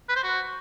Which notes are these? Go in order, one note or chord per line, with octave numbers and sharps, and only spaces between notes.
B4
C5
F#4